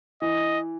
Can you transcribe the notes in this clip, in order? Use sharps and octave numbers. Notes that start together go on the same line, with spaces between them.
E3 D#5